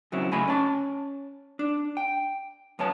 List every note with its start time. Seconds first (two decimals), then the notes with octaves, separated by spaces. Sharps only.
0.12 F#2 C#3 F#3 C4 E4
0.32 C#3 A3 D#5 G#5 B5
0.48 C#4 A5
1.59 D4
1.97 G5
2.79 F#2 B3 C#5 A5